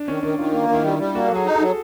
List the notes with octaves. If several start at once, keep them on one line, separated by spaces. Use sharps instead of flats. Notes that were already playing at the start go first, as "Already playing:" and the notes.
Already playing: D4
D#3 C#4
D#3 D4
D#3 F4
A#3
D#3
E4
G3
G3
A#3 F#4
A4
F#3 G#4
D#4
A4
F#3